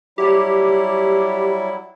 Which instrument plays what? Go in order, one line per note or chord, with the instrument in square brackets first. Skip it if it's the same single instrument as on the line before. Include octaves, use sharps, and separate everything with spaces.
[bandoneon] F#3 G3 E4 [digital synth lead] G4